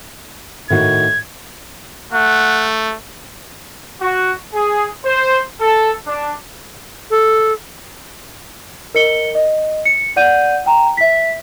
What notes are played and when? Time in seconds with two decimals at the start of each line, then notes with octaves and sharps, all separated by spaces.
0.70 A2 D#3 F#4 G#6
2.13 A3 F#5
4.01 F#4
4.53 G#4
5.05 C5
5.60 A4
6.07 D4
7.10 A4
8.95 A#4 D#5 C#7 G7
9.35 D#5
9.85 C#7
10.16 D5 F#5 G6 D#7
10.66 G5 A#5
10.97 E5 B6